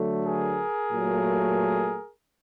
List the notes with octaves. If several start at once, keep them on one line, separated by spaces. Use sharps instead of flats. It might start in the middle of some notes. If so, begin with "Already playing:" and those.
Already playing: D3 F#3 A3
G#4 A#4
A#2 F#3 A3